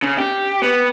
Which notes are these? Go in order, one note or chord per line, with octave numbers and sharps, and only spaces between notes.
C#3
G4
B3